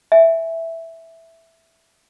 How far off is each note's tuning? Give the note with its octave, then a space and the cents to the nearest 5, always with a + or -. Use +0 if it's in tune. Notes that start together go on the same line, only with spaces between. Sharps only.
E5 +0 G#5 +0